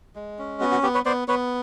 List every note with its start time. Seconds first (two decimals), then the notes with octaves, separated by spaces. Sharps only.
0.16 G#3
0.39 C#4
0.61 B3 F#4
0.72 F#4
0.83 B3 G4
0.94 B4 C#5
1.06 B3 C5 D5
1.28 B3 B4 C#5